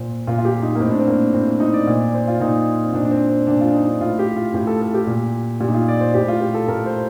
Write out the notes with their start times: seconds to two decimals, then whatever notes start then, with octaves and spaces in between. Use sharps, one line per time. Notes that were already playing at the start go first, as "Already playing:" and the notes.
Already playing: A#2 C5
0.27 A#2 F4
0.38 F4
0.45 G4
0.62 D#4
0.75 A#3
0.80 A2 C4
0.91 D4
0.99 C4
1.07 A#3
1.33 A2 C4
1.48 C4
1.60 D#4
1.74 D5
1.87 A#2
2.00 D5
2.14 C5
2.28 F4
2.40 A#2 D#4
2.84 C4
2.94 A#2 D4
3.05 D4
3.11 C4
3.29 C4
3.47 A#2 D4
3.61 F4
3.74 D#4
3.88 D4
4.01 A2 F4
4.19 G4
4.36 F4
4.54 A2 G4
4.67 A4
4.82 A4
4.94 G4
5.07 A#2
5.60 A#2 G4
5.68 D#4
5.74 F4
5.88 D5
6.00 C5
6.14 A2 G4
6.28 F4
6.41 G4
6.54 A4
6.68 A2 A#4
6.86 C5